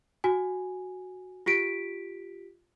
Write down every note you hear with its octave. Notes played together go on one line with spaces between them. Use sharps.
F#4 G#5
F4 G4 B6 D7